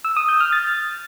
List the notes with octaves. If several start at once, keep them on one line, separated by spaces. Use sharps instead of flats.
E6
D#6
G6
F6
A6